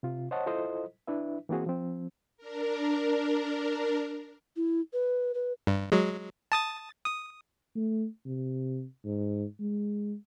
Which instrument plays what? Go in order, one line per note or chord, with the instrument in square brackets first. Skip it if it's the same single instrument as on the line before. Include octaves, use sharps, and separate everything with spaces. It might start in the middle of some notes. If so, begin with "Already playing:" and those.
[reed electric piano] C3 F4
C5 C#5 D#5 F#5 A5
E4 F4 A4 C5 D#5
D4 E4 B4 E5
E3 A#3 C4 F#4 G#4
F3 C4
[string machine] D4 A#4
[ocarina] E4
B4
B4
[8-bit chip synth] G2
F#3 G#3
A5 D#6 A6
D#6
[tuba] A3
C3
G#2
G#3